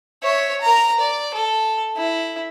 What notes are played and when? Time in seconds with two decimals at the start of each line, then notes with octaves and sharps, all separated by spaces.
0.23 C#5 E5
0.62 A#4 A#5
1.00 D5
1.34 A4
1.96 E4